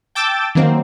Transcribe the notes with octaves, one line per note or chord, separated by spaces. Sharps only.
G5 A5 D6 E6 G6 A6
D#3 F#3 A#3 C4